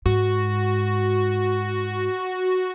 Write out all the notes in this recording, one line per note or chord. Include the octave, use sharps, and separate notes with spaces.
G#2 F#4